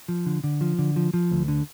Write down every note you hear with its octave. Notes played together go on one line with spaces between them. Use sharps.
F3
D3
D3
F3
D3
F3
F3
D2
D3